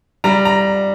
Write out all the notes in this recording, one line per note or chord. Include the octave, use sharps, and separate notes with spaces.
G3 A#5
A#5